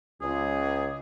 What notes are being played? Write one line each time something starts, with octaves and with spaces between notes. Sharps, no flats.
C#2 G#4